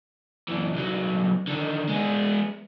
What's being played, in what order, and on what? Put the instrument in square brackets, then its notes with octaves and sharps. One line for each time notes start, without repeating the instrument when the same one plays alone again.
[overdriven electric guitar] F#2 E3
C2 F#3
D3 D#3
G#3 B3